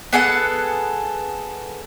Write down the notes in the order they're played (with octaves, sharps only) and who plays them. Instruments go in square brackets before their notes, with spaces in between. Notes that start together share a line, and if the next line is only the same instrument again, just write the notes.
[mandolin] B3 G#4 A4 F#5